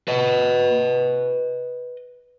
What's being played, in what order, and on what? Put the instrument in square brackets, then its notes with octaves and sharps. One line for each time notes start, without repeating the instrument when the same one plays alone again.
[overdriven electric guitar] B4 D#5